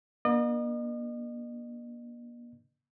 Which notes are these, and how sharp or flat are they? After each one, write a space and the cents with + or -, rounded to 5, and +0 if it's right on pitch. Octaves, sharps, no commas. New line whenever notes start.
A#3 +40 D4 +0 D#5 -40